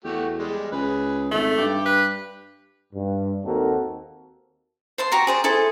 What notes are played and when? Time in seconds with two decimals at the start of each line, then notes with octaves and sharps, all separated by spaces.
0.04 E2 A3 F#4 G4
0.39 G3 G#3
0.72 C#2 G#4 B4
1.31 G#1 A3
1.58 G2 G5 D6
1.86 B4
2.94 G2
3.45 D#2 A#3 C4 D#4 F#4 A4
4.98 C5 A5 C6
5.12 F#4 G4 A#5 C#6
5.27 G#4 C5 D5
5.44 E4 G#4 A4 C5